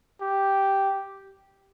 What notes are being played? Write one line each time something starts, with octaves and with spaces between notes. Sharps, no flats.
G4